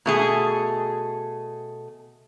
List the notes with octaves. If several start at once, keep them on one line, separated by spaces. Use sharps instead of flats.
B2 A3 G#4